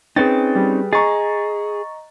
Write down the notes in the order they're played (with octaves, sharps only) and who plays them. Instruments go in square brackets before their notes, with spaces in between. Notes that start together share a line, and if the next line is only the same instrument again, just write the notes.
[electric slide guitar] C4 C#4 D#4 [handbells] G#4 B4 G5 [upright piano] A6
[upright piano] G3
[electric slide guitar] G#4 [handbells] D#5 A#5 [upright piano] C#6 A6